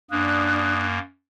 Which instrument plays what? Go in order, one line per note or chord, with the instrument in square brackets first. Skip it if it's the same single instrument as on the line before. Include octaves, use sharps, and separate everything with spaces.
[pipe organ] F#2 A#3 [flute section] D4 D#6 F#6